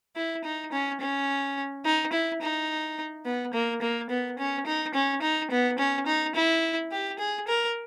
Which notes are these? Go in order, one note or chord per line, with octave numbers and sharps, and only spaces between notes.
E4
D#4
C#4
C#4
D#4
E4
D#4
B3
A#3
A#3
B3
C#4
D#4
C#4
D#4
B3
C#4
D#4
E4
G4
G#4
A#4